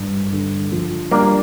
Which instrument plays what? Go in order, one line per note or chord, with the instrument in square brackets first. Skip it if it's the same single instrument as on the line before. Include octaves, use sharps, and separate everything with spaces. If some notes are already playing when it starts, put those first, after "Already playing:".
Already playing: [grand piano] G2
D3
F3
[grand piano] G3 [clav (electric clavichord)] A#3 D4